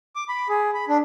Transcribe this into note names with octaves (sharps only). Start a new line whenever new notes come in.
D6
B5
G#4
B5
D4